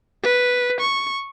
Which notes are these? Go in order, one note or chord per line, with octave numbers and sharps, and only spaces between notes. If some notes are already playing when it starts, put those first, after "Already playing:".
B4
C#6